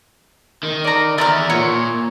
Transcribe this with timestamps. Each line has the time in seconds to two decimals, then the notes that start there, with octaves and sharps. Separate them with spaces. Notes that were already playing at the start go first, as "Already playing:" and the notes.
0.63 D#3
0.84 D5 A#5
1.18 E3 B3 D5 A#5 F6
1.50 A#2 C#5